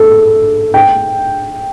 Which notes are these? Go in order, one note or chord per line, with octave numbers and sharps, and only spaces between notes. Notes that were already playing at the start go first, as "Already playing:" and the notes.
Already playing: A4
G5